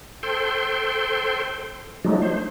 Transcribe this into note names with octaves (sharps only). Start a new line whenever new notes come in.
A4 C5 G5 C6
F3 F#3 G#3 A3 D4 D#4
C5